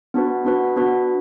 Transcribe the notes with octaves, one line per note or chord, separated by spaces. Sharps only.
B3 D4 F#4 B4
B3 D4 F#4 B4
B3 D4 F#4 B4